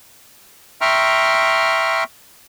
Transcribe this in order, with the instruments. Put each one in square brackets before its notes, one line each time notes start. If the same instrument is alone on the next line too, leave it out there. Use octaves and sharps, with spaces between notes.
[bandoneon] E5 G5 A#5 C6 C#6 F6